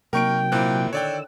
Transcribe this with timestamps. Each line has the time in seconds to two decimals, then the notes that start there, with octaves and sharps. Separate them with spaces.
0.13 C3 F#3 A#3 D#4 A#4 G5 C#6 D7
0.52 A#2 A#3 C4 E4 F#6
0.93 D3 D#3 C#5 D5 G5 E6